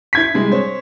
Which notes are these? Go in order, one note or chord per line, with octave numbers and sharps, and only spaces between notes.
E4 G#6 B6
C3 G3 G#3
C5 C#5